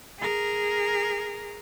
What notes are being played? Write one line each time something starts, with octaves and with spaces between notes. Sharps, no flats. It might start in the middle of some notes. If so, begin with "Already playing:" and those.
G#4 A#4